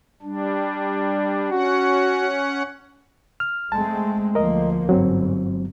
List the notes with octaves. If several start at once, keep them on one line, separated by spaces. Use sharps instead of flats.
G3 D4
C#4 F#4 F#5
F6
G#3 A3 C4 A5
D2 F3 A#3 A#4 D#5
G1 G#2 F#3 C4